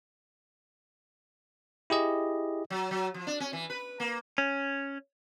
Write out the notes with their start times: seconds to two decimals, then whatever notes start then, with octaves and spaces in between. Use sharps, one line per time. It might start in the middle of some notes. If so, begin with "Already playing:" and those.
1.90 E4 G4 G#4 D#5
2.70 F#3
2.91 F#3
3.14 F3
3.27 D4
3.40 C#4
3.53 E3
3.70 B4
4.00 A#3
4.38 C#4